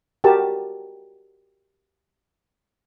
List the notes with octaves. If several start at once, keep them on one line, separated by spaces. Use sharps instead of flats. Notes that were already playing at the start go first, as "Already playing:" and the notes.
F#4 G4 A#4 A5